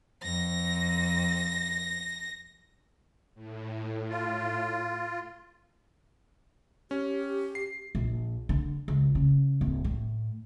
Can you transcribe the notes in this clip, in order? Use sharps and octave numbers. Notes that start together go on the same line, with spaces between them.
F2 A#6
A2
F4
C#4 G4
C7
A#1
D3
C#2
C#3
D1
A2